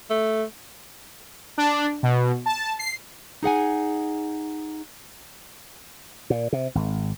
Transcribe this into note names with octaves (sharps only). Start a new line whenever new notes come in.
A3
D4
B2
A5
C7
D#4 G#4 F#5 G#5
A#2
C3
G#1